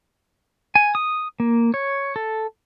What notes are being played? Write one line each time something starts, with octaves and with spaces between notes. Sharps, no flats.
G#5
D#6
A#3
C#5
A4